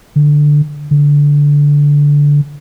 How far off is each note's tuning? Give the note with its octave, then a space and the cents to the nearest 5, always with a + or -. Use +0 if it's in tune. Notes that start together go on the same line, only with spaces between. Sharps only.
D3 +5
D3 -15